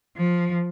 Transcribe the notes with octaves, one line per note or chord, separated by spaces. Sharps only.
F3